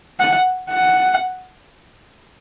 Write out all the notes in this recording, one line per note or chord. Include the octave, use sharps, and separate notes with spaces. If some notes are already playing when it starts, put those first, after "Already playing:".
F#5
F#5